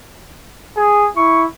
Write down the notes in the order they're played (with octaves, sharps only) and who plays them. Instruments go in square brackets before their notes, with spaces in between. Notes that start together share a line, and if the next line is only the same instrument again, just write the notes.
[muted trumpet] G#4
[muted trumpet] E4 [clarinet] C#6